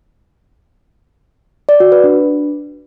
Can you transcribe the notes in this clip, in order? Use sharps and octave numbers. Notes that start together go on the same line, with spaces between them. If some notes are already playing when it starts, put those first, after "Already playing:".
D5
F#4
B4
D4